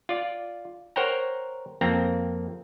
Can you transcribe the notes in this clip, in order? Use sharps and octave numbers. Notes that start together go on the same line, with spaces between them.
F4 D5
A#4 C5 C#5 F#5 G5 A#5
F2 A#3 C4 A#5